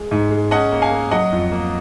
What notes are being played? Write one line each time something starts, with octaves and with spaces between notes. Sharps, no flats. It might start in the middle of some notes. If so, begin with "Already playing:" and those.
Already playing: G#3
G#2
G#3
C#4 D#5 F#5
A#3
F5 G#5
A#3
F#3 D#5 F#5
F2
A#3